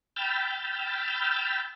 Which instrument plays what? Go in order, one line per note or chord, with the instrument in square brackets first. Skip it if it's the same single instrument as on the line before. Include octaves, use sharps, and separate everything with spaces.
[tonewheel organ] G5 B5 E6 F6 G6 A6